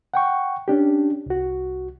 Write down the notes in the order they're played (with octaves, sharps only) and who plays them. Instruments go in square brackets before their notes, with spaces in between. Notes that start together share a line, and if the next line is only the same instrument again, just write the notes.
[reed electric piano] F#5 G5 C#6
C#4 D4 G4
C2 F#4